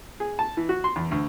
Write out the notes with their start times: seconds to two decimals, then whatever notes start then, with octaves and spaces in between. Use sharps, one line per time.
0.20 G#4
0.39 A5
0.57 E3
0.69 F#4
0.84 C6
0.96 E2
1.11 D2